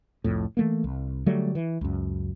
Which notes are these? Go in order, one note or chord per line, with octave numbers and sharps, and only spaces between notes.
C2 F2 A2
E3 A3 A#3
C2
D3 F#3 G3 A3
E3
C#2 F#2